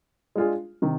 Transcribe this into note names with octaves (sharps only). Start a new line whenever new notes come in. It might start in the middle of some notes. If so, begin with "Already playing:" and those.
G#3 D4 F4 G#4
C3 D#3